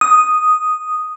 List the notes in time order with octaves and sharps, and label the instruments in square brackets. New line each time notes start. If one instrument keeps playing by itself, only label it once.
[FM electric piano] D#6